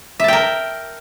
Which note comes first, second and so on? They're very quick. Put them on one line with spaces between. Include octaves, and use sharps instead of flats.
E5 A5 G5 A#4